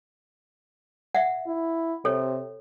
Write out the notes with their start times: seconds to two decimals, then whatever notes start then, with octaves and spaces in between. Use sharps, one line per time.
1.15 E5 F#5
1.47 E4
2.05 C3 A4 C#5